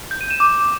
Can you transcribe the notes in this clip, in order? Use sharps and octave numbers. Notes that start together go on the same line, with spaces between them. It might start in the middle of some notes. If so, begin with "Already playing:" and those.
G6
D#7
E7
D6